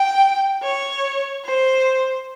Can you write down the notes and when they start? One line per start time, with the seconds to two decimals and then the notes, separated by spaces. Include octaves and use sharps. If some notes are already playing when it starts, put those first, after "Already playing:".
Already playing: G5
0.62 C#5
1.45 C5